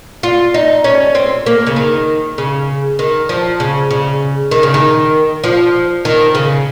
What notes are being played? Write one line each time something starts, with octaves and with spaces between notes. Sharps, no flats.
F4
D#4
C#4
C4
A#3
C#3
D#3
C#3
D#3
F3
C#3
C#3
D#3
C#3
D#3
F3
D#3
C#3